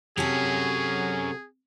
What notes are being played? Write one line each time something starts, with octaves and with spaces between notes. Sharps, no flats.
C3 F#3 C#4 F#4 G#4 A4